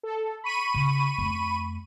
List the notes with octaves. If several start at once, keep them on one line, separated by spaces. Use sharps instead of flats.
A4
B5 C#6 D#7
C#3
F2 A3